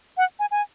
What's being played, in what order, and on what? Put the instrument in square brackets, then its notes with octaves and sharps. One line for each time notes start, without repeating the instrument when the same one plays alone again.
[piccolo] F#5
G#5
G#5